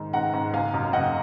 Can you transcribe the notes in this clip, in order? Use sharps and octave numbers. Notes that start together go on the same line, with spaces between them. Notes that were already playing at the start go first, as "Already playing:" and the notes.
Already playing: G#2 D#3
G#2 F#5 A#5
G#2
F#1 F5 G#5
F#2
F#1 D#5 F#5